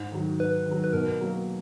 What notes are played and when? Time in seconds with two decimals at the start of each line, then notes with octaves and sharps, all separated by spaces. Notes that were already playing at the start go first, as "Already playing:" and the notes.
Already playing: G#2
0.12 D#3 F#3
0.40 G#2 B4
0.66 D#3
0.71 F#3
0.84 B4
0.93 B2 A#4
1.21 F#3 A#3